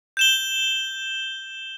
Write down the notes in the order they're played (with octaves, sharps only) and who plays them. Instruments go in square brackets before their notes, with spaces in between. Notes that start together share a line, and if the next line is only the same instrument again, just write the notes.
[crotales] G6 E7 G7